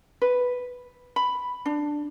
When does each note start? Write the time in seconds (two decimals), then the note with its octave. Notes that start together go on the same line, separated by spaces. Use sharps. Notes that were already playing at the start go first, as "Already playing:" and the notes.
0.22 B4
1.16 B5
1.66 D4